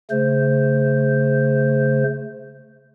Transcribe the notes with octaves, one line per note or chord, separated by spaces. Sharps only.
C#3 A3 C5